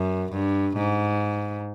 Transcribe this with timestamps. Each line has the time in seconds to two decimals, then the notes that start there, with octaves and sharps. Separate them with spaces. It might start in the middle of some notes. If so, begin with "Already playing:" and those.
Already playing: F#2
0.32 G2
0.77 G#2